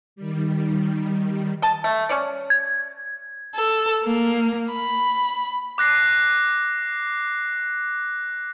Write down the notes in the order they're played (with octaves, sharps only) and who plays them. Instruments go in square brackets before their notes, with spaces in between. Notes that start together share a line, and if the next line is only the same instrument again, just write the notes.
[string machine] D#3 G3
[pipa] D#5 A5
A3
C#4 C#5 D5
[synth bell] G#6
[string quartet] A4
A#3
B5
[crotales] D6 F#6 A#6 C7